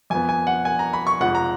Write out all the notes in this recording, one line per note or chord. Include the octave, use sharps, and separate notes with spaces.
F2 F3 B3 G#5
G#5
F#5
G#5
A#5
B5
C#6
F1 F2 F3 G#3 F#5
A#5